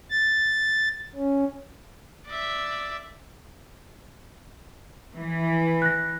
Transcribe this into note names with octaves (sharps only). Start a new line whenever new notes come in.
A6
C#4
D5 E5
E3
F#6 A#6